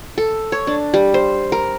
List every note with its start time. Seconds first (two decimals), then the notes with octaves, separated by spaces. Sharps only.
0.18 A4
0.52 C#5
0.67 D4
0.94 G3
1.14 C5
1.52 A#4